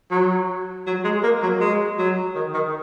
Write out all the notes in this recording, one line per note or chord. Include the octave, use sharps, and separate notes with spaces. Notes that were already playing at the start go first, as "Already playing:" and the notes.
F#3
F#3
G#3
A#3
F#3
G#3
F#3
D#3
D#3